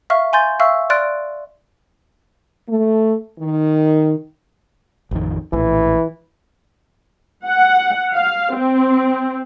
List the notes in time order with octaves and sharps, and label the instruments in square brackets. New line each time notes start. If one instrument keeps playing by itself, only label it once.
[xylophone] E5 F5 C#6 F6
G#5 C6 G6 A6
E5 F5 C#6 E6 F6
D5 C6 F6 F#6 A6 D7
[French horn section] A3
D#3
[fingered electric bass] A1 F2 D#3
[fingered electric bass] A#1 A2 [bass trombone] E3
[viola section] F#5
F5
C4